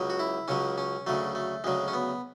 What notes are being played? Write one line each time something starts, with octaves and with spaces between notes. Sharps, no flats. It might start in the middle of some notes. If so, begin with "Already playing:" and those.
Already playing: C#2 C#3 F#3
F#4
E4
C#2 C#3 F#3 C#4
C#4
D2 C#3 F#3 A3
A3
D2 C#3 F#3 G#3
C#4
B3